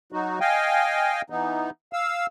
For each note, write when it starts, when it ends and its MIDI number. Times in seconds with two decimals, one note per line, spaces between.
0.12 0.39 54
0.12 0.39 63
0.12 0.39 66
0.40 1.22 75
0.40 1.22 77
0.40 1.22 79
0.40 1.22 80
1.30 1.70 52
1.30 1.70 59
1.30 1.70 63
1.93 2.26 77
1.93 2.26 88